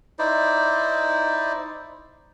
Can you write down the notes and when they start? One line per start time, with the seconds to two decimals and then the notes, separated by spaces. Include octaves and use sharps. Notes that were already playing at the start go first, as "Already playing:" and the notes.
0.19 D#4 E4 C5 D5